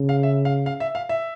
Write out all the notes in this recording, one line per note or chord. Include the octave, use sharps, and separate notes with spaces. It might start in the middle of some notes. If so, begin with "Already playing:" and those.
Already playing: C#3
F5
E5
F5
F5
E5
F5
E5